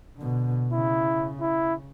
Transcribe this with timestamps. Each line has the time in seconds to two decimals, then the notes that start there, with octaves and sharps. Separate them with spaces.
0.17 B2 D3
0.73 C#3 E4
1.41 E4